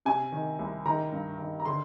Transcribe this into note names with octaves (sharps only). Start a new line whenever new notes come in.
C3 G#5
D#3
C2
D#3 A#5
G2
D#3
A#5
D3 C6